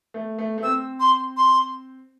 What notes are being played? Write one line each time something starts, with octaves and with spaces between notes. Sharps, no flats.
A3
A3
A3
C4 E6
C6
C6